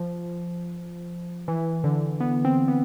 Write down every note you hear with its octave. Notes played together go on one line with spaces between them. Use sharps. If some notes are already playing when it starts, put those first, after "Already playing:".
Already playing: F3
E3
D3
B3
C4
B3